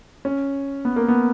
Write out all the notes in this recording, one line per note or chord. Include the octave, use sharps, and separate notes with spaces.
C#4
B3
A#3
B3